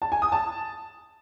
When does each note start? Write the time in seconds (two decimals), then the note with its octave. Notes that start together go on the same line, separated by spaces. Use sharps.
0.02 A5
0.12 G#5
0.22 D#6
0.32 A5